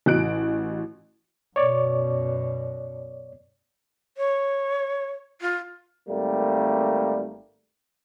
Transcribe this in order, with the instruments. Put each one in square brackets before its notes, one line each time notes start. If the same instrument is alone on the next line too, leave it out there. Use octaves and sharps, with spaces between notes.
[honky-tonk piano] A1 F#4 F#6 D7
[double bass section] F#2 B2 [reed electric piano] C#5 D5
[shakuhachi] C#5
F4
[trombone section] G#1 G3 A3 A#3